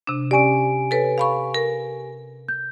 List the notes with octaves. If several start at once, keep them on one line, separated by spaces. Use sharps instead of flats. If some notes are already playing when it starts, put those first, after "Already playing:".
C3 D4
C#4 G4 D5 G#5 D7
A4 B4 C#5
F5 B5 C#6
A#4
G6